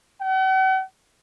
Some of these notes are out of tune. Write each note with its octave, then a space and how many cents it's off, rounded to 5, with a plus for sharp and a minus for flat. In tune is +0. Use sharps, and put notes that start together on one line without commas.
F#5 +45